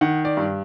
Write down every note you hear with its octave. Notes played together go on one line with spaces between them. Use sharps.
D#3 F#5
D5
G2